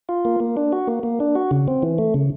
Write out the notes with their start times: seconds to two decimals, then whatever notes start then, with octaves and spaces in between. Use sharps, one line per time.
0.09 F4
0.25 A#3
0.40 A#3
0.57 D4
0.72 F#4
0.87 A#3
1.03 A#3
1.20 D4
1.35 F#4
1.51 C#3
1.68 C4
1.83 E3
1.98 A3
2.14 C#3